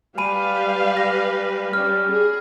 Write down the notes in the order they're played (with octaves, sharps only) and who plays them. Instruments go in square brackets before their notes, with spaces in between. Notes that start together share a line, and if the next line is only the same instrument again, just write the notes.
[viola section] G3 B4 F5 [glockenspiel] G#5 B5 D#7
[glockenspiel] A#6
[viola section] G3 C#4 [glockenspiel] F6
[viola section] G#4